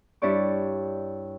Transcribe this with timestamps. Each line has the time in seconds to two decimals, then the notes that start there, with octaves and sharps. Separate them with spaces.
0.22 G2 E4 C#5 D5 C#6